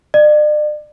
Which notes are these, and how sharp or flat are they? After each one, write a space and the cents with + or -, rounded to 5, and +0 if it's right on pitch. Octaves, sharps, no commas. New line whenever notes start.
D5 +40